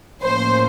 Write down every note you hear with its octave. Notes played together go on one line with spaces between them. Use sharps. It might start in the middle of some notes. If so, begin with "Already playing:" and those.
A2 F3 A#3 C#4 C5